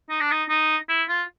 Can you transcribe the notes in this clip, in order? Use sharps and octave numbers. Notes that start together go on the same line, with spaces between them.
D#4
D4
D#4
D#4
E4
F4